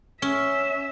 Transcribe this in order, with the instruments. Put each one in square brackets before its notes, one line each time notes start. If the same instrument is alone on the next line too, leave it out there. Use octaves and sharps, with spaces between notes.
[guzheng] C#4 [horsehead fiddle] E5